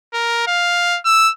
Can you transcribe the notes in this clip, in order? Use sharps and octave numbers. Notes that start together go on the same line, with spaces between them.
A#4
F5
E6